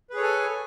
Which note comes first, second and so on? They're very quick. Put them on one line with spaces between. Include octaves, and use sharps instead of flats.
B4 G#4 C#5 A4 G#5